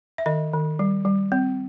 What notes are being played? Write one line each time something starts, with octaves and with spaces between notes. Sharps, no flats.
E5
D#3 D#5
D#3
G3
G3
C4